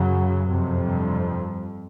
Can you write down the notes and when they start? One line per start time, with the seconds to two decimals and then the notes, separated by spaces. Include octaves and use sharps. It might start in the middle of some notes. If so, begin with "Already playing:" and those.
Already playing: F#2 C#3 F#3
0.47 F2 C3
0.79 G2 G3